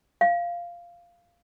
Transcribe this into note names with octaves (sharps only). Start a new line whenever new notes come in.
F5